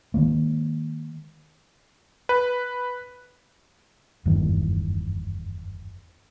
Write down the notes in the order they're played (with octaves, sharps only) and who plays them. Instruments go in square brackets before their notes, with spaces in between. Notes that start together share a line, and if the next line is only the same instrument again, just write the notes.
[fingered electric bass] D#3 F3 G#3 A#3
[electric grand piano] B4
[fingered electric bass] F#1 E2 G2 D#3